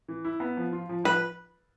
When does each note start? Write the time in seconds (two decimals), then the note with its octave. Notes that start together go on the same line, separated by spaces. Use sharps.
0.08 E3
0.25 E4
0.40 B3
0.57 F3
0.73 F4
0.89 F3
1.04 F3 B4